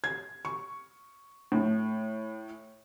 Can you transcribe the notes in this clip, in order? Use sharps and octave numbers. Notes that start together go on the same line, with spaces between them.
G#6
C#6
A2